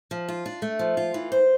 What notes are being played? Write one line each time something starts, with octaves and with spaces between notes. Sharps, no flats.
F3
F4
D4
A3
F3
F4
E3
C5